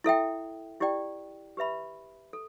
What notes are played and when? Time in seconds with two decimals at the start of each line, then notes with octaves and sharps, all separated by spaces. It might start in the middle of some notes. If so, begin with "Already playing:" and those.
0.04 E4 A4 E5 G5
0.80 E4 G4 D5 G5
1.57 G4 B4 E5 B5
2.33 A4